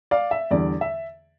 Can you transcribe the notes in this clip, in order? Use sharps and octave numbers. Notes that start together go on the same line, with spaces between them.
D5 F5
E5
E2 D3 G3 D5
E5